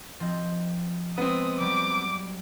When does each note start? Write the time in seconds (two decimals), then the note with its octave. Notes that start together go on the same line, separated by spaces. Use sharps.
0.20 F3 C4 D#5
1.18 G#3 B3 C4 D#6
1.60 F#3 G3 D6